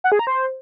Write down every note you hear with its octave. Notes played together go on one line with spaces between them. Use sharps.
F#5
G#4
A#5
C5